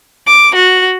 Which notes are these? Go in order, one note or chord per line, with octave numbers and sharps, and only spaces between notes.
D6
F#4